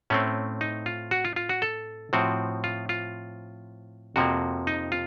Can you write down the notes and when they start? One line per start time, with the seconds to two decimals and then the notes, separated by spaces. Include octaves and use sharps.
0.10 A2 A3 C4 C#4
0.61 D#4
0.86 F4
1.11 F#4
1.25 F4
1.36 F4
1.49 F#4
1.62 A4
2.13 A2 F3 C4 F#4
2.64 F4
2.89 F4
4.16 F2 C3 F3 A#3 F#4
4.67 D#4
4.92 F4